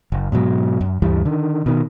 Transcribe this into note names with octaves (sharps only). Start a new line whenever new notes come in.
F#1
G#2 B2 F#3
F#2
D2 G2 E3 G3
D3 D#3
B2 D#3